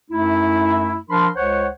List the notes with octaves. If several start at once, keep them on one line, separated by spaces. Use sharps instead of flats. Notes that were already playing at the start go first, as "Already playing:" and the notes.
F#2 A3 D#4 E4
F3 D4 A#4 B5 C6
C#2 C5 C#5 F#5